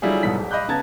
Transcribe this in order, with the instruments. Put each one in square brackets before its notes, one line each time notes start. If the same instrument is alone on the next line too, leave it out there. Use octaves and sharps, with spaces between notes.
[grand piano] D3 F#3 G3 E4 F4 G#4
C2 G#2 B2 F#3 A4 B6
D1
D#5 F5 B5 D6 F#6 G6
C#3 B3 A5 A#5 G#6 A6